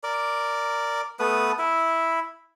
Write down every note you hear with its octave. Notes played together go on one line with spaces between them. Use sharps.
A#4 D5
A3 B3 B4 D#6
E4 E5